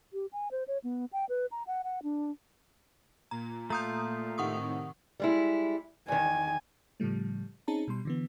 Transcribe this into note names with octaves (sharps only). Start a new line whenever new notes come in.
G4
G#5
C5
C#5
B3
G5
B4
A#5
F#5
F#5
D4
A#2 A#5
A3 F4 A#5 D#6 G6
A2 C3 D#3 F#5 C#6 D#6
G3 G#3 E4
E2 D#3 G#5
A2 C#3 F3 G3 A3
C4 C#4 D#4 G#4 A5 A#5
B2 G3 C6
D3 E3 B3